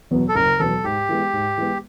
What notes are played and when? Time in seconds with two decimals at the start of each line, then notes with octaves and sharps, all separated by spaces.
0.11 E2 B2 F#3 B3
0.29 A4
0.35 F#1 A#4
0.60 E2 B2 F#3 B3 A4
0.84 G#2 G4
1.09 E3 G#3 B3
1.33 G#2
1.58 E3 G#3 B3